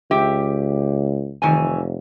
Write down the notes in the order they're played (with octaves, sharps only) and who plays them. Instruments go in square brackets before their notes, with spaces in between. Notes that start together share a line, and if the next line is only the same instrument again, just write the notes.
[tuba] C#2 [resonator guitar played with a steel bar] G4 E5 G5
[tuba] F1 [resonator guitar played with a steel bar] D#3 E3 G#5